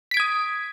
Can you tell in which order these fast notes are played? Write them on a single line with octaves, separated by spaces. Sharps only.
B6 D7 G#6 D#6